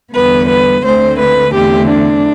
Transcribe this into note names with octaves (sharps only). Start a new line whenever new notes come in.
E2 D3 G3 B3 B4
B4
D2 D3 A3 C4 C5
B4
E2 D3 A3 C4 G4
D4